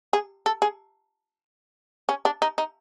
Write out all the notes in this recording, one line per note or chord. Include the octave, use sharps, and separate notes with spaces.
G#4
A4
G#4
C#4
D4
D#4
D#4